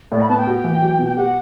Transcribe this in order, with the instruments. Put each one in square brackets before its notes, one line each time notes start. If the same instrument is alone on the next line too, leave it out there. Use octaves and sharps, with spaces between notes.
[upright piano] A2 [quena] D5
[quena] B5
[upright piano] B3 [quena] A5
[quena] G5
[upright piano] F#4
E3
F#3
B2
[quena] G5
[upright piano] G4 [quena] F#5